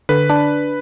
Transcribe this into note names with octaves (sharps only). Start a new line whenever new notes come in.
D3 B4
D4